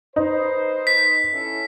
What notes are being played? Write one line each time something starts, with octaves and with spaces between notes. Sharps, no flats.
D#4 B4 C5
B6
C#4 E4 A4